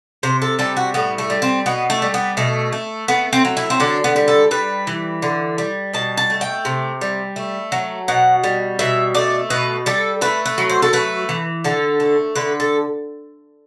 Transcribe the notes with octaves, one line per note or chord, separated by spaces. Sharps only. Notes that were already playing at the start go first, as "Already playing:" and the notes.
C3 C5
A4
G3 A4
F#4
A2 B3
A3
G3
C4
B2 B3
A3
G3
B3
B2 A3
A3
A3 B3
C4
F#3
E4
C4
D3 D4
B3
G3
A4
G3 B4
E3
D3
G3
B2 A5
A5
A3
G5
C3
G3
A3
F#3
B2 F#5
G3
B2 E5
A3 D5
B2 B4
G3 A4
A3 B4
B4
F#3
C5
A4
A3 B4
E3
D3 A4
A3
D3 B4
A4